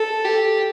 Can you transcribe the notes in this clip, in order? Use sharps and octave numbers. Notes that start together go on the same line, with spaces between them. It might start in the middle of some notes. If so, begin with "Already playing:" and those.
Already playing: A4
G4